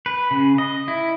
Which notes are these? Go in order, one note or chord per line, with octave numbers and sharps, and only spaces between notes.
B4
C#3
D#5
E4